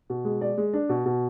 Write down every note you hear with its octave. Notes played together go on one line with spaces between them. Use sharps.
B2
G#3
D5
G#3
D4
B2
B2